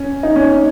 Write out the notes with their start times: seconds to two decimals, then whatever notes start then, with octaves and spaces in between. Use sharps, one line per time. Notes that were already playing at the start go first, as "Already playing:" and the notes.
Already playing: C#4
0.23 D#4
0.36 C#4
0.47 D#4